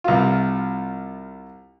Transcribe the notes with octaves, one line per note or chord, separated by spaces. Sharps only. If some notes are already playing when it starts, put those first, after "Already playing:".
C2 F4